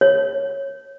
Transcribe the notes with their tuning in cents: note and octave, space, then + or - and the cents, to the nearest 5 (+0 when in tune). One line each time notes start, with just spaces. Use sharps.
C#5 -15